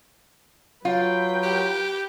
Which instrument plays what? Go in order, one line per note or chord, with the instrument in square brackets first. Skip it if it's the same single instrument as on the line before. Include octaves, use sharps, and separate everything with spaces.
[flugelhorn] F#3 [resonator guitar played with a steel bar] F4 [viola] B4 G5
[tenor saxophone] G4